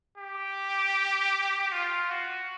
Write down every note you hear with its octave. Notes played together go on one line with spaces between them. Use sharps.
G4
F4
F#4